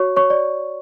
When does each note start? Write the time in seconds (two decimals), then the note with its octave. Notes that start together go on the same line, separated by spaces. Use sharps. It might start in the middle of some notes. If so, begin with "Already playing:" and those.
Already playing: F#4 C#5 C#6
0.16 C#5 C#6
0.30 D5